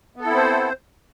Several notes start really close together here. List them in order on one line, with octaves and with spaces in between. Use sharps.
B3 A4 E4 C4 C5